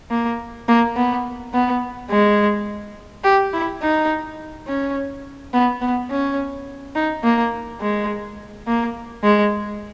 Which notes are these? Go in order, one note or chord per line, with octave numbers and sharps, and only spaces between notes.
A#3
A#3
B3
B3
G#3
G4
E4
D#4
C#4
B3
B3
C#4
D#4
A#3
G#3
A#3
G#3